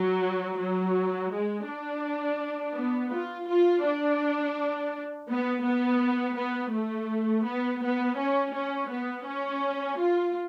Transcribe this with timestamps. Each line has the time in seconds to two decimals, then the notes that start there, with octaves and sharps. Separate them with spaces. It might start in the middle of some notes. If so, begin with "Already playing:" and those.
Already playing: F#3
0.58 F#3
1.30 G#3
1.67 D4
2.74 B3
3.11 F4
3.48 F4
3.84 D4
5.28 B3
5.64 B3
6.36 B3
6.73 A3
7.45 B3
7.82 B3
8.17 C#4
8.53 C#4
8.89 B3
9.26 C#4
9.98 F4